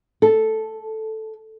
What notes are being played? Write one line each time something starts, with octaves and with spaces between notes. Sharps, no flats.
A4